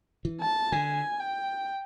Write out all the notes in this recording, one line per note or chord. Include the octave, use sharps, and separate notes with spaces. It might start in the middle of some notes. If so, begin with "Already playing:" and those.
E3
A5
D3 G#5
G5